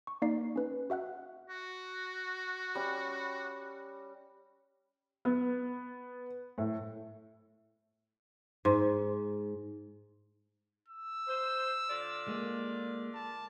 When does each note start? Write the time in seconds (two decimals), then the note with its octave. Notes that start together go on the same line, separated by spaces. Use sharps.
0.07 C#6
0.22 A#3 D#4 D5 C7
0.56 C#4 B4
0.90 F#4 E5 F#5 F#6
1.49 F#4
2.75 G3 C#4 D6
5.25 B3
6.58 A2
8.65 G#2
10.89 E6
11.28 C5
11.90 D3 F4 D5
12.28 G#3 A#3
13.15 A5